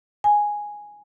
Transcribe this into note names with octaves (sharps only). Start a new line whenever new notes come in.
G#5